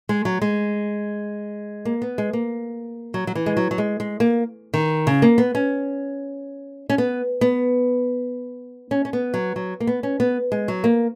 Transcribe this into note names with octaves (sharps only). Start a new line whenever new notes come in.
G#3
F#3
G#3
A#3
B3
G#3
A#3
F#3
F#3
E3
G#3
F#3
F#3
G#3
G#3
A#3
D#3
C#3
A#3
B3
C#4
C#4
B3
B3
C#4
C#4
B3
F#3
F#3
A#3
B3
C#4
B3
G#3
F#3
A#3